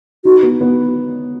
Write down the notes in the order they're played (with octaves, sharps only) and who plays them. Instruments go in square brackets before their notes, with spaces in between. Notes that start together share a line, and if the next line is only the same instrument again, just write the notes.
[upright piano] D#4 [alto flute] F#4
[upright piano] B3
B3